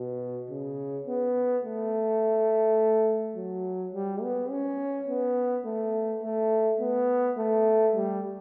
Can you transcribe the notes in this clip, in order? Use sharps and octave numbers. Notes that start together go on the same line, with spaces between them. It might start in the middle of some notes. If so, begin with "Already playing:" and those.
Already playing: B2
C#3
B3
A3
F#3
G3
B3
C#4
B3
A3
A3
B3
A3
G3